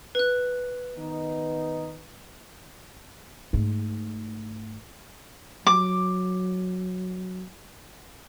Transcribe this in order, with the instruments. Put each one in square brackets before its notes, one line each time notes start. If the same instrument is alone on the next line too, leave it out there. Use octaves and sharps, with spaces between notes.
[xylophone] B4 F#6
[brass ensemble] D#3 B3 D#4
[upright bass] G#2 A3
[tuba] F#3 [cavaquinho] D6